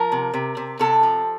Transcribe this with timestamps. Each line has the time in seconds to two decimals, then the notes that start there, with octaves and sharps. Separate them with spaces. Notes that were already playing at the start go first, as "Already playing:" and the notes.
Already playing: F3 A#4
0.12 C3
0.34 C3
0.57 C3
0.79 C3 A4
1.03 F3